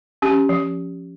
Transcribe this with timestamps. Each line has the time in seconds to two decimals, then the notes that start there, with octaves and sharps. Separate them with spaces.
0.22 C#4 G4
0.49 F3